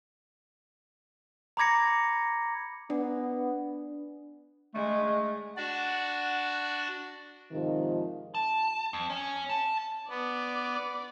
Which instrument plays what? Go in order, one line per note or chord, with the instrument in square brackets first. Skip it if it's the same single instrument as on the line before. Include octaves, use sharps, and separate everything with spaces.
[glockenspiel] A#5 B5 D6 G#6 A#6 C#7
[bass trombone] B3 [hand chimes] D4 D5
[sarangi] G#3 [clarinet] A3
[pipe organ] D4 F#4 D5 [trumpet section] F#5
[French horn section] G#2 C3 D#3 F3
[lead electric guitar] A5
F2
C#4
A5
[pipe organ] B3 [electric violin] D5